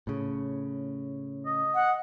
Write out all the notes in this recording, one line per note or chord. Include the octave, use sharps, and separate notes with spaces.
A2 C#3
D#5
F#5